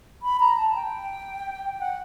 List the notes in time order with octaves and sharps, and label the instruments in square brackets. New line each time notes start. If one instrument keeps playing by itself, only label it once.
[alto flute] B5
A#5
A5
G5
F#5